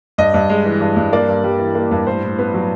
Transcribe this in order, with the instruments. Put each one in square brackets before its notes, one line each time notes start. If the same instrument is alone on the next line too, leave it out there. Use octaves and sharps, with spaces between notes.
[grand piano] G2 D#5
G2
G#3
E3
G2
G2
A#3 D5
G2
G3
E3
A#3
G2
A2 C5
A2
B3
F#3